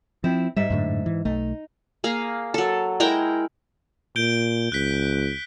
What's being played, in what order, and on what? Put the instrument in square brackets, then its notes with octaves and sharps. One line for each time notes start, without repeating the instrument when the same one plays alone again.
[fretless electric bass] F3 [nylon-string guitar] C4 E4
[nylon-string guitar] G#2 E5 [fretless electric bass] G3
[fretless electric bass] F#2 A2 D3
E3
[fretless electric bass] B1 A3 [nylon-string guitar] D#4
[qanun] A#3 G#4 F5
F#3 A4
G#3 E4 A#4 G5
[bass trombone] A#2 [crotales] G6 D7 G7
[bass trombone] C#2 [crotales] F#6 B6